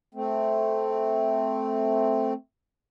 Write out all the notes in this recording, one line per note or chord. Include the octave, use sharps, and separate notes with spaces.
A3 C4